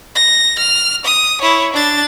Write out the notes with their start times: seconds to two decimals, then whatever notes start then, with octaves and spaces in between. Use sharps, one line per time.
0.15 A#6
0.59 F6
1.05 D#6
1.42 E4 C#5
1.73 D4 A6